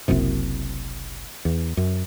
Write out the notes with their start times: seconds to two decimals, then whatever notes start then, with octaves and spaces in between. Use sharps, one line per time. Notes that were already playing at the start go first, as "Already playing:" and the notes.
0.08 F#1 C2 F#2 C3
1.45 E2
1.77 F#2